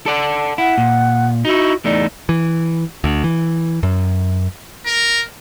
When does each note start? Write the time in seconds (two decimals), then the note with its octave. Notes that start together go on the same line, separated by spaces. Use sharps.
0.06 A4 D5 F#5
0.58 E4 F#5
0.78 A#2
1.45 D#4 E4 F#4
1.85 E2 A3 D#4 D5
2.29 E3
3.04 D2
3.24 E3
3.83 F#2
4.86 A#4